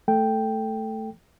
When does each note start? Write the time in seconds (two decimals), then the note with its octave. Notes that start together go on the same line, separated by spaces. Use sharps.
0.08 A3 A4 G5